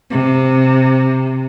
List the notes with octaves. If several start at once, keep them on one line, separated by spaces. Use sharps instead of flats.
C3